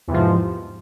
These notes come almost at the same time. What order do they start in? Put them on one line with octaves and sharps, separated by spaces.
E2 C3 F3 G#2